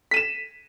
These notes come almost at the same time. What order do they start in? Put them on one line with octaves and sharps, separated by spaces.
B6 D#7 E7